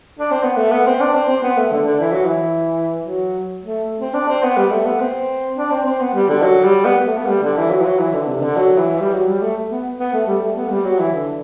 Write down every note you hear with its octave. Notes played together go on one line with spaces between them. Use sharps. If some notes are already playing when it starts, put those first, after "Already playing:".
D4
C4
B3
A3
B3
C4
D4
C4
C4
B3
A3
D3
D3
E3
F#3
E3
F#3
A3
C4
D4
C4
B3
G3
A3
B3
C4
D4
C4
C4
B3
G3
D3
F#3
G3
B3
A3
B3
G3
D3
E3
F#3
E3
F#3
E3
D3
C3
D3
F#3
E3
G3
F#3
G3
A3
B3
B3
A3
G3
A3
B3
G3
F#3
E3
D3